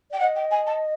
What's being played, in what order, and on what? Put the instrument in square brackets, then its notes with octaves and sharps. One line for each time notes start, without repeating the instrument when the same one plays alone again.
[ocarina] D5 [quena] G5
[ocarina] D#5 [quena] F#5
[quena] G5
G#5
A5